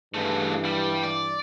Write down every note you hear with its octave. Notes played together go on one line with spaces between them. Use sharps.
G2 C#3 E3 A3
G3
D5